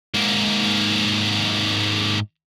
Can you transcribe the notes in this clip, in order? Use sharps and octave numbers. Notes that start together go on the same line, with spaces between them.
G#2 A#3